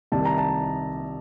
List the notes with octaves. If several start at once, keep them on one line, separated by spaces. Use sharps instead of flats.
C2 C3 D#3 A5
A#5
A5